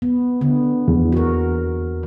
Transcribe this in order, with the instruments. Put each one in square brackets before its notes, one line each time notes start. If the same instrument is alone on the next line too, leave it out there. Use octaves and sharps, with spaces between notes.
[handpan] B3
D3 B3
[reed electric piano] E2
[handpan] F#4 A#4